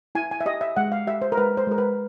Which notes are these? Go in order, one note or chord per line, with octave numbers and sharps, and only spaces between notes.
E4 G#5
G#5
E5
G4 D#5
E5
G#3 F#5
F5
G4 E5
C5
A#4
G#3 B4
C5
G#3 A#4
B4